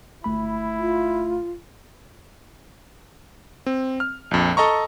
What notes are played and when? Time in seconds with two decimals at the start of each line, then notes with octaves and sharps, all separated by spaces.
0.24 G1 A3 E4 B5
0.79 F4
3.66 C4
4.00 F6
4.31 A#1 F2
4.57 A4 D#5 A#5 C#6